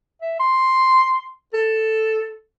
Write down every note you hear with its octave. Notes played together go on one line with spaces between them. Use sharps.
E5
C6
A4